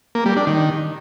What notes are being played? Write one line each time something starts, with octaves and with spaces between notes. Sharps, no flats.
A#3
G3
D4
D#3